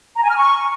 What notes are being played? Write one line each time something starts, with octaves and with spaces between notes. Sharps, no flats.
A#5
G#5
F6
C#6